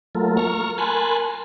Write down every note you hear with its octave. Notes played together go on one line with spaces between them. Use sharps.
F#3 A3 A#3 F4 A4 A#4
A#5 C#6 F6
A#4 G#5 A5 B5 C6 F#6